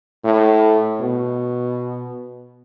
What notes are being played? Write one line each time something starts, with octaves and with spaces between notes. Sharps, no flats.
A2
B2